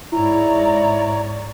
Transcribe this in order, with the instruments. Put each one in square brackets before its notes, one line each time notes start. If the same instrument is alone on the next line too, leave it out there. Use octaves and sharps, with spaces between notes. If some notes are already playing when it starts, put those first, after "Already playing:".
[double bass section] G#2 [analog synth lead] E4 [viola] C#5 D5 [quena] A#5